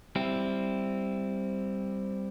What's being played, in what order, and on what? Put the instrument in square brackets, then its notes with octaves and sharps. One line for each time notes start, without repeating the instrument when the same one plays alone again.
[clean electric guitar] G3 C4 E4